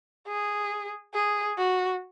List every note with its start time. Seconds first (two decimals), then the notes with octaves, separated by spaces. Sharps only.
0.28 G#4
1.14 G#4
1.58 F#4